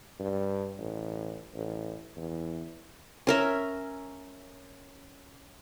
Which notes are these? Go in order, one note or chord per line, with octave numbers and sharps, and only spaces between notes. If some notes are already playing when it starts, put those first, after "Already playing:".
G2
A1
A1
E2
C#4 A#4 E5